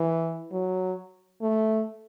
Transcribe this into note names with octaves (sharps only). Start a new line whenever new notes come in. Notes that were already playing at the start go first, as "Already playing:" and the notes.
Already playing: E3
F#3
A3